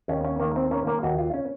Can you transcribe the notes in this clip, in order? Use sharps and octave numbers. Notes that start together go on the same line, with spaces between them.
D#2 C#4
C#4
D#3 A#3
C4
A#3 C#4
A#3
D#2 F#4
F4
C#4